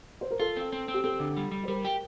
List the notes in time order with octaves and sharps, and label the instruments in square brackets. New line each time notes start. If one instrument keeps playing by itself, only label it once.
[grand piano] C5
A#4
[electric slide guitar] F4 [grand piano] A4
[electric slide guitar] C4
C4
C4
[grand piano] G4
[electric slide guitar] C4 [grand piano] A4
[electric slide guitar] D3
G3
G3
[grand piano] C5
[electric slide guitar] G3 [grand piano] A#4
[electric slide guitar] G4